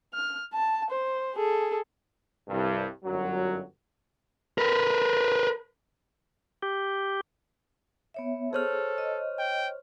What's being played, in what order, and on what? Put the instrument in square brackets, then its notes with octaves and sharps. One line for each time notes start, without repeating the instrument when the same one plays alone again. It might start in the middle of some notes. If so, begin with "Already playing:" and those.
[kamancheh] F6
A5
C5
G#4 A4
[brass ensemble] C2 G2
G1 F#2 F#3
[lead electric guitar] A#4 B4
[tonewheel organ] G4
[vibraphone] B3 C#5 E5
[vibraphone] G#4 [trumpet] A4 [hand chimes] C5 C#5 F6
[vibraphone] D#5
[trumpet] G5